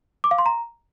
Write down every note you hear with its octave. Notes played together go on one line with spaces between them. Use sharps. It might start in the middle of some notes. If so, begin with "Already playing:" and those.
D6
F5
C6
A#5